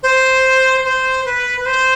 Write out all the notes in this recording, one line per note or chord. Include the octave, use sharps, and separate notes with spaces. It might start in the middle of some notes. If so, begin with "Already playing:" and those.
C5
C5
B4
B4
C5